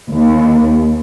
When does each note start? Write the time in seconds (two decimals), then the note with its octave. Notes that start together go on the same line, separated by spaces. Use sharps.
0.11 D#2